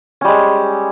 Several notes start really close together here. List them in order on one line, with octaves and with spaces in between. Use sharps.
C#4 G3 G#3